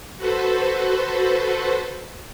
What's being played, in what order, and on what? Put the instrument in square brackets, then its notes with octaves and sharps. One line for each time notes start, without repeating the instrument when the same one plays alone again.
[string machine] F#4 A4 B4 C5